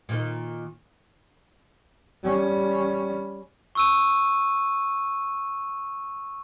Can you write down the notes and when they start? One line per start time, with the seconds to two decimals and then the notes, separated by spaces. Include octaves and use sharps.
0.09 A#2 D#3
2.24 G3 C#4
3.75 C#6 E6 D#7